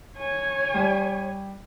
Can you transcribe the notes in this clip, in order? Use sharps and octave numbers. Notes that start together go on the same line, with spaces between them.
C#5 G#5
G3